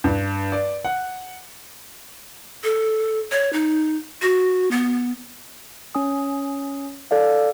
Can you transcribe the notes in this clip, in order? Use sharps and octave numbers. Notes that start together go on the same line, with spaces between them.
G2
D5
F#5
A4
C#5
D#4
F#4
B3
C#4 G#5 D#6
A4 D5 F5